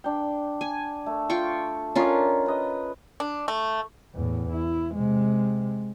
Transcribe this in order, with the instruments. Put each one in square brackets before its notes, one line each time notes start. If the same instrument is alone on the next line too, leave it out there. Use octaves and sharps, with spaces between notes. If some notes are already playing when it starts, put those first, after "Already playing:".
[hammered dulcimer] D4 G5
[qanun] G#5
[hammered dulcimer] A3
[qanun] F4 G5 C#6
[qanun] C#4 D4 F4 [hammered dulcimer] A#4 D#5
[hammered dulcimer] B4 D#5
[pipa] D4
A3
[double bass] E2 A2
E4
C3 G#3